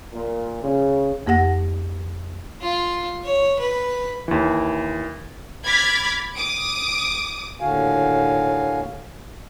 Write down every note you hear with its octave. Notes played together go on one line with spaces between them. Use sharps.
A#2
C#3
F2 A#3 G4 F#5 A#6
F4
C#5
B4
D#2 E3
B5 D6 F6 G#6 A6 B6
D6 D#6 D7
D#2 A2 D3 F#4 F5 G#5